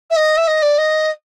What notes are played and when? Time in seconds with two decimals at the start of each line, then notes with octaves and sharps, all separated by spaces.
0.10 E5
0.16 D#5
0.37 E5
0.47 D#5
0.62 D5
0.77 D#5